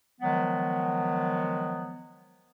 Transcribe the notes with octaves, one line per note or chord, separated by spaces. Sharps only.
D#3 F3 F#3 G#3 B3